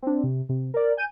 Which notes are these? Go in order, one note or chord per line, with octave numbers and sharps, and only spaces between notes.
C4 D4
C3
C3
A#4 D5
G#5 G6 D#7